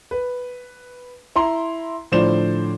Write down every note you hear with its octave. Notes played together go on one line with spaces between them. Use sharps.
B4
E4 A#5 C6
A2 D3 F3 C5 D5 E7